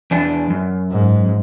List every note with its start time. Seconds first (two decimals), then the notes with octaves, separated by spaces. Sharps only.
0.11 E2 D4
0.50 F#2
0.91 G#2